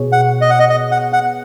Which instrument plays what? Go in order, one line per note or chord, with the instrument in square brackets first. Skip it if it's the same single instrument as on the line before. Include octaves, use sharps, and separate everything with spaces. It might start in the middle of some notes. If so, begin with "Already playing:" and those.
Already playing: [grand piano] B2 B3 G#4 C#5
[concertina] F#5
D#5
F#5
D#5
D#5
F#5
F#5